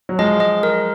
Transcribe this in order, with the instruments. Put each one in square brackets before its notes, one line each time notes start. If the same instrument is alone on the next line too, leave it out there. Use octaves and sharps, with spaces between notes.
[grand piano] F#3
[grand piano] F3 G#3 [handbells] D#5
[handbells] D#5
A#4